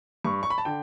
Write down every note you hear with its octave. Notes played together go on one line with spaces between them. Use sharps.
G2 C#6
C#6
B5
A5
D3 G5